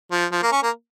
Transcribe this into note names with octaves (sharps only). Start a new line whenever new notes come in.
F3
F3
A#3
C#4
A#3